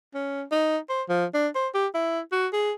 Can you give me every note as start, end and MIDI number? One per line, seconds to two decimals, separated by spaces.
0.14 0.43 61
0.51 0.78 63
0.89 1.02 72
1.09 1.25 53
1.34 1.48 62
1.55 1.68 72
1.75 1.87 67
1.94 2.20 64
2.32 2.47 66
2.53 2.72 68